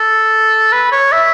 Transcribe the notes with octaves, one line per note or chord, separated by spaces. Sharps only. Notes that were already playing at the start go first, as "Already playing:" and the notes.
Already playing: A4
B4
C#5
E5